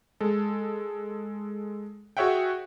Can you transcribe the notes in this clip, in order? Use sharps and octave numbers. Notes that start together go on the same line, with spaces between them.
G#3 A4
F#4 G#4 C#5 E5 F#5 G5